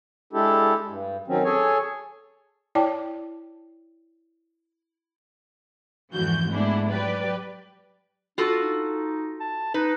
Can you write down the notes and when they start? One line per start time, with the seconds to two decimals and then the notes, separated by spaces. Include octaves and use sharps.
0.33 G#3 D4 E4 G4 A4
0.87 G2
1.27 D#3 F#3 C4 C#4
1.44 G#4 A4 C#5 G#5
2.75 E4 C#5 D5 G5 A5 D6
6.14 F2 G#2 D3 E3 F#4 G6
6.49 G#2 G#3 A3 B3 D4 E4
6.88 F#3 G4 B4 D5
8.38 D4 F4 F#4 A4
8.61 D#4
9.40 A5
9.74 D#4 B4